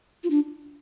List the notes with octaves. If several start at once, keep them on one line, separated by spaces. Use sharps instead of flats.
F4
D4